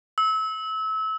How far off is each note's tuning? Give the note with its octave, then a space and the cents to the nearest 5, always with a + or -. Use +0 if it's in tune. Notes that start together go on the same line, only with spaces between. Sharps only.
E6 -30